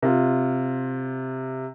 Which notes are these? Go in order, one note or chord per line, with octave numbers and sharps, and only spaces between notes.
C3 F4